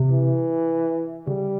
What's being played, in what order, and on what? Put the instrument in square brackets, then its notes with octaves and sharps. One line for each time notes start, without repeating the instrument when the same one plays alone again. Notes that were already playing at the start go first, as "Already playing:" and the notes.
Already playing: [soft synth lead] C3
[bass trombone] E3
[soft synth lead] C#3 [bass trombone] G3